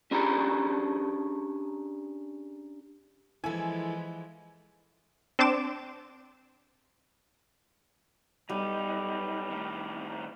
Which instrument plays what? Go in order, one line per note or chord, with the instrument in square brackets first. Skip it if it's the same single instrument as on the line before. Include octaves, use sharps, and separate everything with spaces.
[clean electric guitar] C#4 D4 G4 G#4 A#5 B5
[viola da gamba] E3 F3 G#3 [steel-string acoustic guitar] E4 A4 [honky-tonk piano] G#5
[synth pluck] C4 D4 C6 D6 E7
[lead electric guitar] B1 D#4 [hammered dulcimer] G3
[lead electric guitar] A2 D#3